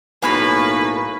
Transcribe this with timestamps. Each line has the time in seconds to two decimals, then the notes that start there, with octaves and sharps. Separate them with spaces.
0.22 B1 A2 A#3 G#4 B4 C#5 B5